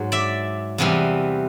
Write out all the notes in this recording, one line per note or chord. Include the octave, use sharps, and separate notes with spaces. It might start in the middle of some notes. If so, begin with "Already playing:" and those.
Already playing: G#2 F#3
D5 E5
E2 C3 E3 G3